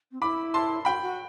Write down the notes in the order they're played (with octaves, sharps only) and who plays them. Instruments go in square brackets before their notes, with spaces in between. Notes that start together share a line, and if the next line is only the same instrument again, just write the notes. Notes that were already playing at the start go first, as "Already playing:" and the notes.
[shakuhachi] C4
[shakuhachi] E4 [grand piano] B5 D6
[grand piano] A5 C6
[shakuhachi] F#4 [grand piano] G5 B5
[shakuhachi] F#4